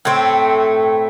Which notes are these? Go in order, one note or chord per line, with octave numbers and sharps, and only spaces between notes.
A2 A3 C4